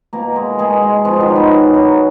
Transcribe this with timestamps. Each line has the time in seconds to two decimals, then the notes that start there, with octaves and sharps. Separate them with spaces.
0.13 B2 A#3 A#4
0.36 G#3
0.59 B2 G#3 G#4
0.82 G#3
1.05 B2 F3 F4
1.20 D#3 D#4
1.28 F#3
1.35 B3 B4
1.52 B2
1.75 F#3